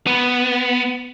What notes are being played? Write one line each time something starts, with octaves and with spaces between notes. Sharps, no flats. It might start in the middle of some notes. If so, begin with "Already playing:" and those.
B3